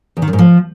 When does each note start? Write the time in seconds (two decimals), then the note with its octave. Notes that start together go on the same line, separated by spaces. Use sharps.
0.17 E2
0.22 D#3
0.28 F#2
0.33 G#2
0.39 F3